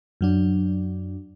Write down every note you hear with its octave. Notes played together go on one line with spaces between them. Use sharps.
F#2 F#3 D4